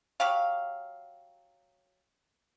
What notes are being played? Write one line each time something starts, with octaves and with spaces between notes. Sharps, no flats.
F#3 G4 F5